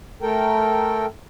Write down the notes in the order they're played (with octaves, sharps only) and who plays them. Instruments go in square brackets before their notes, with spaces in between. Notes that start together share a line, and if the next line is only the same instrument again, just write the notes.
[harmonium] A3 A4 A#4 G5